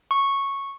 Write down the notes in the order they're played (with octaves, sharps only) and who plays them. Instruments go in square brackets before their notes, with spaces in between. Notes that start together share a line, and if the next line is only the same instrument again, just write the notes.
[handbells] C#6